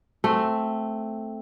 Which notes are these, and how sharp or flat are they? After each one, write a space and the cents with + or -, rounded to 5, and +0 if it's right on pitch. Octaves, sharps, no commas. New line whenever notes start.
A3 +0 C4 +0